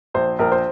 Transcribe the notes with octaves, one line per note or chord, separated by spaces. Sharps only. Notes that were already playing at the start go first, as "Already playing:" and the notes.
A#1 C5
A#1 A#4
C5